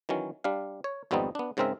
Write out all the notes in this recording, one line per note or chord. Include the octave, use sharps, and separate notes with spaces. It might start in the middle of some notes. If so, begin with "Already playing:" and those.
D#3 E3 F#3 C#4
G3 D4 F5
C#5
G#1 F2 G3 B3 C4 D#4
B3 D4
G#2 C#3 G#3 C4 A#4 E5